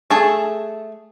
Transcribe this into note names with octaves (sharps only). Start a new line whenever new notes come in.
A3 G#4 A4